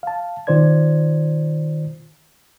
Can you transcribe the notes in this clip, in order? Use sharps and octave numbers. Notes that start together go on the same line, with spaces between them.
F5 A5
B2 D#3 F4 C5 D5 G#6